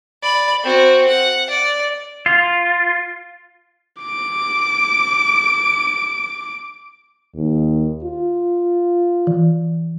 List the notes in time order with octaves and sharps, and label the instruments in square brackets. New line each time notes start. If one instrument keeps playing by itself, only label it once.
[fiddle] D5 B5
C4 F#4
F#5
D5
[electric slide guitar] F4
[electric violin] D6 D7
[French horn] D#2
F4
[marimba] E3